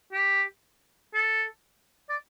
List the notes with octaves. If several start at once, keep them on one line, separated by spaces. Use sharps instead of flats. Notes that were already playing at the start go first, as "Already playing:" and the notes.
G4
A4
D5